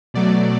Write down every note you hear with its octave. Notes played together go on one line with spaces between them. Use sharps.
B2 F#3 A3 D5